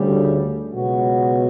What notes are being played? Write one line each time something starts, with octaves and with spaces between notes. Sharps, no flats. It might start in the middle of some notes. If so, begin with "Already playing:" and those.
Already playing: D2 C#3 G3
C#2 B2 F#3 B3 F#4